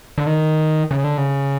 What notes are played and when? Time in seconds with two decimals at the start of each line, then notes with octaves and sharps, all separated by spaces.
0.18 D3
0.27 D#3
0.91 C#3
1.04 D3
1.18 C#3